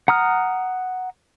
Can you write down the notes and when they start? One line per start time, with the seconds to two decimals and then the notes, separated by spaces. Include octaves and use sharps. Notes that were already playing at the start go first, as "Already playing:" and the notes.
0.08 F#5 A#5 D#6 F6